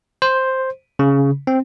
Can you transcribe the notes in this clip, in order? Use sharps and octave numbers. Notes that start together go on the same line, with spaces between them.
C5
C#3
C4